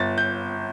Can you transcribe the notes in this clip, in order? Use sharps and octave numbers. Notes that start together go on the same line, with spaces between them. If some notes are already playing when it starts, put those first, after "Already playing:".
Already playing: G1 A6
G6